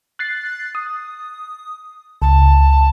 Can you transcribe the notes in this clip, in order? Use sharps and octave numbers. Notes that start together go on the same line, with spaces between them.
F#6 A6 C7
D#6
C#2 A5